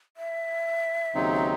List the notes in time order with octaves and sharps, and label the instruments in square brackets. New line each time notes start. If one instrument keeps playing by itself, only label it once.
[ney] E5
[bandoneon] D#2 C#3 F#3 C4 D#4